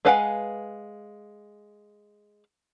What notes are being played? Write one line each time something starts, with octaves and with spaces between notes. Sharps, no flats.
G#3 B4 F5 F#5 G#5